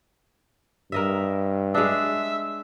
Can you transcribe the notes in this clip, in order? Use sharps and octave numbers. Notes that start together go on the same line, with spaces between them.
G2 A#4 D#5 E5
G#3 D4 E5